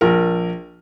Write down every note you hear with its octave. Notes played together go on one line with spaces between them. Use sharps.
A#1 A#4